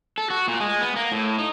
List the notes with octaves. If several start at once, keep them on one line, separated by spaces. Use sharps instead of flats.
A4
F#4
A#2
G#3
B3
A#3
A2
D#4